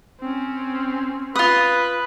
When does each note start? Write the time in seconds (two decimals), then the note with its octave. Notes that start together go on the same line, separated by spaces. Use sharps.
0.21 C4 C#4
1.36 F4 B4 D#6